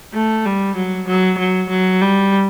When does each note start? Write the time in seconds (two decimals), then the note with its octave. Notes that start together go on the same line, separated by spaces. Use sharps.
0.13 A3
0.45 G3
0.76 F#3
1.07 F#3
1.38 F#3
1.69 F#3
2.01 G3